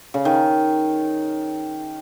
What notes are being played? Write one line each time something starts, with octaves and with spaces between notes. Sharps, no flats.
C#3
D#3